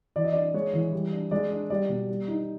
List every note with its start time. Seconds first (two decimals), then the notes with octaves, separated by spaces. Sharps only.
0.16 E3 D5
0.24 D#5
0.33 D4 D5
0.54 G#3 C#5
0.73 E3
0.93 G3
1.12 D4
1.31 G#3 D5
1.51 D4
1.70 G3 D5
1.89 B2
2.08 G3
2.28 D#4